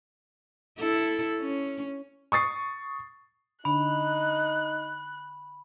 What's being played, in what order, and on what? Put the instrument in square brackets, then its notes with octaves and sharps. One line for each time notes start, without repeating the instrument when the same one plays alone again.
[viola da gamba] E4 A4
C#4
[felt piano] C#6 D#6 A6 C7
[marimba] D3 D4 [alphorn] D#4 [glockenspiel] B5 [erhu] F#6